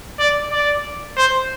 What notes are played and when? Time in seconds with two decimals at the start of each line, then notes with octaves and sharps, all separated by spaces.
0.19 D5
0.52 D5
1.17 C5